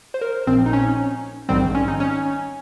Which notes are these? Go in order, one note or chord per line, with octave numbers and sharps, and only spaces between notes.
C5
A#4
A#1 A#2 F3 C4
D#4
C#4
A#1 G#2 D#3 G3 C4
C#4
D#4
C#4